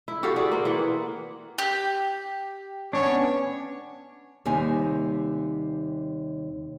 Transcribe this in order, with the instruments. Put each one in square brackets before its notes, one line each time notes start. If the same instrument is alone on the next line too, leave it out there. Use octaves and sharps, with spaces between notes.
[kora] E4
F#4 G4 A4 F5
F#4 G#4 A4 D5
A#3 C4
E3 F#5
[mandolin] G4
[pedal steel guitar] B3 C#4 D4 [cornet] C#5
[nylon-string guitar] D#2 C3 G3 D#4 G#5